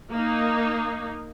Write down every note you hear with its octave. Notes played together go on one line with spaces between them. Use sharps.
A#3 D#4